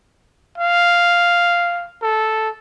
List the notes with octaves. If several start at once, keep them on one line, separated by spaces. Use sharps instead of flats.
F5
A4